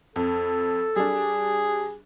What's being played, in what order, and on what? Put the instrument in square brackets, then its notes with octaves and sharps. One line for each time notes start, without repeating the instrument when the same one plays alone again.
[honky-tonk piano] F2 [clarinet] A4
[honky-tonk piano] G3 D4 [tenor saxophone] G#4